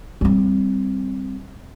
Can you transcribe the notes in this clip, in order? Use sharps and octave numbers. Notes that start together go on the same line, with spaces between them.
G3 C4